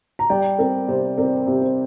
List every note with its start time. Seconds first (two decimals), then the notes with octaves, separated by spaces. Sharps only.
0.19 A#5
0.30 G3 D5 G5
0.59 C4 A#4
0.88 C3 C5
1.17 C4 A#4 D5
1.47 C3
1.62 C5